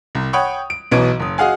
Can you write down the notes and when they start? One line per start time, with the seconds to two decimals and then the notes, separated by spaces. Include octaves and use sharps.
0.15 C2
0.33 C#5 F#5 G5 B5 C#6 D#6
0.70 D7
0.91 B1 B2 E3 D#5 D7
1.20 F#1 D#6
1.38 F#4 G#4 D#5 F5 F#5 G#5